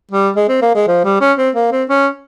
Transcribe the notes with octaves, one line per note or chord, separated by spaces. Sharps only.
G3
G#3
C4
A#3
G#3
F3
G3
C#4
C4
A#3
C4
C#4